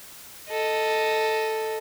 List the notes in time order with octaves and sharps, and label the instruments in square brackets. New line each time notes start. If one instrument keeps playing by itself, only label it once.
[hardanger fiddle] A4 D#5